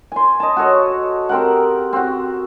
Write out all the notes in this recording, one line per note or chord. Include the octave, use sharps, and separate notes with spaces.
G#5 C6
D#5 A5
F#4 A4 C#5 D#5
C4 G4 A#4 F#5
C4 F#4